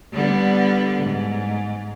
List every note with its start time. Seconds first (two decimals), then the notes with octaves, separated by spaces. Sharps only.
0.13 D3 G3 B3
1.02 G#2